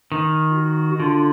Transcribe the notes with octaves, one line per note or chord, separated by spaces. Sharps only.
D#3
F4
F#4
F#4
D3 F4